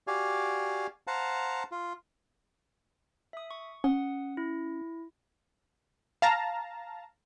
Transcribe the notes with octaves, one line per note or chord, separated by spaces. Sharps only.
F#4 G4 D5 F5 G#5
C5 F5 F#5 A5 A#5
F4
E5 D#6
C#6
C#4 F#5 D#6
E4
F5 A5 A#5